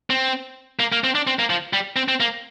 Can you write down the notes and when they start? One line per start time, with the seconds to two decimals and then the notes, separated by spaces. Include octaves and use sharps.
0.10 C4
0.79 A#3
0.92 A#3
1.04 C4
1.15 D4
1.27 C4
1.39 A#3
1.50 F3
1.73 G3
1.96 C4
2.08 C4
2.20 A#3